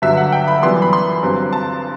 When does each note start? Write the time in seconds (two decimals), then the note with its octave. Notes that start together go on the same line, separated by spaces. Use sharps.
0.02 G1 G2 D3 F#3 E5
0.17 F#5
0.32 G5
0.48 B5
0.62 F#2 E3 G3 B3 C6
0.82 B5
0.93 C6
1.23 G1 G2 F#3 C4
1.53 A5